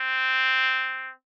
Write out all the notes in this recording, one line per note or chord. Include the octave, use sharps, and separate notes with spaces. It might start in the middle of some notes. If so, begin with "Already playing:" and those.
Already playing: C4